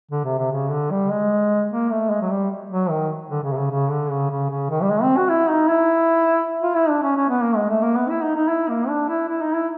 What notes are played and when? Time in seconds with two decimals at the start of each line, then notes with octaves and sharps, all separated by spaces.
0.11 D3
0.25 C3
0.38 C3
0.52 C#3
0.71 D3
0.91 G3
1.11 G#3
1.71 A#3
1.91 A3
2.10 G#3
2.22 F#3
2.31 G3
2.70 F#3
2.91 D#3
3.31 D3
3.43 C#3
3.52 C3
3.57 C#3
3.71 C#3
3.90 D3
4.10 C#3
4.30 C#3
4.50 C#3
4.70 D#3
4.82 G3
4.90 G#3
5.03 C4
5.17 F#4
5.29 E4
5.50 D#4
5.70 E4
6.62 F4
6.76 E4
6.89 D4
7.03 C#4
7.16 C#4
7.29 B3
7.42 A#3
7.56 G#3
7.69 A3
7.82 A#3
7.96 B3
8.10 E4
8.23 D#4
8.36 D#4
8.48 E4
8.69 A#3
8.89 D4
9.09 E4
9.29 E4
9.42 D#4
9.55 E4